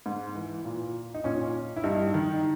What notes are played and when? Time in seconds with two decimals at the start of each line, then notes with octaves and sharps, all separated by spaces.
0.06 G#2
0.35 E3
0.65 A#2
1.14 D#4
1.24 A#2 C#4
1.76 E4
1.84 G2 D#4
2.14 D#3